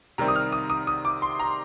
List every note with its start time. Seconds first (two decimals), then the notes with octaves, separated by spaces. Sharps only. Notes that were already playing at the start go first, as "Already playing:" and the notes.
0.18 C3 D#3 G3 C4 A#5
0.28 D#6
0.36 F6
0.52 D#6
0.70 D#6
0.87 D#6
1.05 D6
1.22 C6
1.40 A#5